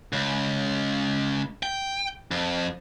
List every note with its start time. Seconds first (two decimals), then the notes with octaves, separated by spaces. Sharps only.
0.13 C#2
1.63 G5
2.31 F2